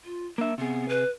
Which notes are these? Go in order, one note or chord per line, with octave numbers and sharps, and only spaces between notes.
F4
A#3 D4 E5
C3 B3 G#4
B4